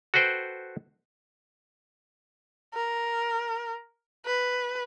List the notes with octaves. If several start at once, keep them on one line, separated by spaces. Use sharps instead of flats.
F#4 A4 B4 C5 G5
A#4
B4